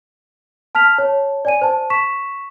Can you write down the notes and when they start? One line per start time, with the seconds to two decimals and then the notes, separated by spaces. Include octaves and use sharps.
0.75 A5 F6 B6 F7
0.98 C#5 A5
1.45 D5 G#5 D#7
1.62 C5 A5
1.90 C#6 B6 E7